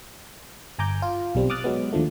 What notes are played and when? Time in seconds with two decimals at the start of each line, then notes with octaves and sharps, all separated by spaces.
0.78 G1 G#5 A#5 D6 G6
1.02 F4
1.35 B1 G3 C4
1.50 D6 D#6 F6 F#6 A6
1.64 F#3 G#3 B3
1.93 D#2 D3 F3 A3